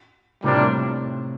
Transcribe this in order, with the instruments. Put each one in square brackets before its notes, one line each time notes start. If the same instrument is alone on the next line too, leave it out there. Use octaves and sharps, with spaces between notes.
[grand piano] A2 C3 [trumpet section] G3 A#3 D4 F4